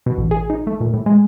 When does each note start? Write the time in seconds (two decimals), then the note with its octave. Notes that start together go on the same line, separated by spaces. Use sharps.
0.06 B2
0.18 A1
0.31 G#4
0.50 D#4
0.67 A3
0.81 A#2
0.93 A2
1.06 G#3